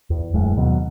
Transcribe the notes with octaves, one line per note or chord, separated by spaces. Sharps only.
E2
D1 F#2 A2 G#3
D#2 B2 F#3